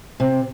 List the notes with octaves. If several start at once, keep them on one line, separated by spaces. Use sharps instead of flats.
C3